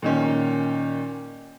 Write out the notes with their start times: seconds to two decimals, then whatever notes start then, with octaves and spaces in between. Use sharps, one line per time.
0.02 A#2 D#3 C#4